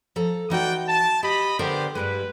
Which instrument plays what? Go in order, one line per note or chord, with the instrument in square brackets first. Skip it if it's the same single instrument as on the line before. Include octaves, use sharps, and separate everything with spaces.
[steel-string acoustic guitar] F3 A4 A#5
[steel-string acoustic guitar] E3 D#4 F#4 [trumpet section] D5 F#5 G5
[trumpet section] A5
[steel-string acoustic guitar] G4 [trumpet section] D#5 B5
[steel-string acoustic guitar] D3 A#4 D5 [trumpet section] B3 G4 C5
[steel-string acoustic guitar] G2 G3 G#3 [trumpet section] B4